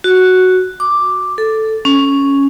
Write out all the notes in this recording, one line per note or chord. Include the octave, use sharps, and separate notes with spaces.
F#4
D6
A4
C#4